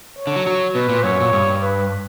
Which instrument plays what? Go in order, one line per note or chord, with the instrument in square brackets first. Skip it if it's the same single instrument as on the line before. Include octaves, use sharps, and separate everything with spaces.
[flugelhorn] C#5
[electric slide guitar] D3
F#3
F#3
[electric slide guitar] B2 [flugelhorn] B4
[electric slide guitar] A#2
[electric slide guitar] F#2 [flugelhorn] C#5
[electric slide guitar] A#2
G2
[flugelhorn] B4